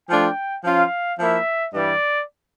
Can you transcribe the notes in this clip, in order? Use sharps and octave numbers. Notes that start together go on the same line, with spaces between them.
F3 A3 D4 F4 G5
F3 C#4 F4 F5
F3 A#3 E4 E5
G2 E3 G3 D5